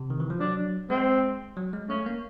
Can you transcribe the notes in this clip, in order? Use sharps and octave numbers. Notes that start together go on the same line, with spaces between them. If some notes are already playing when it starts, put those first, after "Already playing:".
Already playing: C3
D#3
E3
F3
F#3 D4
G#3 C4
F#3
G#3
A3 C#4
A#3